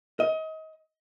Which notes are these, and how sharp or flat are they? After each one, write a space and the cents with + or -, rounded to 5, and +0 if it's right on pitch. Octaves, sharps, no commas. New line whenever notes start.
D#5 +30